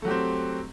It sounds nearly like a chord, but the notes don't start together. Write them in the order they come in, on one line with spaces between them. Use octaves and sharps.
A3 F#3 G4 C4